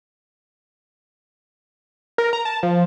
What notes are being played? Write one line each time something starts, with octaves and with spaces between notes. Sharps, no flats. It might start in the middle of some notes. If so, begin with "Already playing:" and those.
A#4
A#5
A5
F3